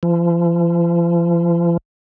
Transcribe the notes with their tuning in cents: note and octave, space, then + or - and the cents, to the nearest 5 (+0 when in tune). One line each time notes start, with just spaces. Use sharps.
F3 -40